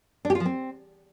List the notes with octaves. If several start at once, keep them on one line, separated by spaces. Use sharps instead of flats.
D4
G4
F4
F3
C4